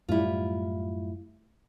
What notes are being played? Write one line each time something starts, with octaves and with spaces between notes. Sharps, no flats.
F#2 A2 G3 E4 F4